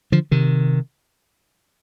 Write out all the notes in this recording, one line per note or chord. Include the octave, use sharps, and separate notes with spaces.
D3 F3
C3 D#3